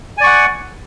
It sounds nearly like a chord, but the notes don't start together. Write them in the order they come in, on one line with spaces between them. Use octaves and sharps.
G#5 D5 C#6 F#5